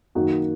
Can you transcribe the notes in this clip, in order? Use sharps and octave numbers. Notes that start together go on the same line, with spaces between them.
F#2 D#3 A#3 D#4 F#4